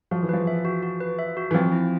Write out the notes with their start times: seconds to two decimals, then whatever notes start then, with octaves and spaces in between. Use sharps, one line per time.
0.11 F3 F#4
0.23 E3
0.29 F3 B4
0.47 E5
0.65 F#4
0.83 F#4
1.01 B4
1.19 E5
1.37 F#4
1.51 E3
1.54 F3 C4
1.72 E4